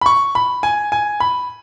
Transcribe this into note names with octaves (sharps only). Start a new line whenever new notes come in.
B5
C#6
B5
G#5
G#5
B5